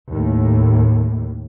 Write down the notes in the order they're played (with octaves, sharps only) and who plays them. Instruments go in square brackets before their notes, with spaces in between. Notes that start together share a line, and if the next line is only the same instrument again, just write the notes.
[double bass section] D#2 A2